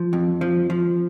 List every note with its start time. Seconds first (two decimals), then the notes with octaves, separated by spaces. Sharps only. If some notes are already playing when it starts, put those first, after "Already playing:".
Already playing: F3
0.13 F2
0.41 F3
0.70 F3